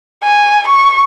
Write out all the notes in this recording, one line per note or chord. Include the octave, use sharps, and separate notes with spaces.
G#5
C#6